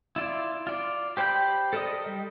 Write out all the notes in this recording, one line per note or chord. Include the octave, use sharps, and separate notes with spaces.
E4 F4 D5
F4 D5
G4 C5 G5 B5 G6
A4 A#4 D5 D#5 D#6
G3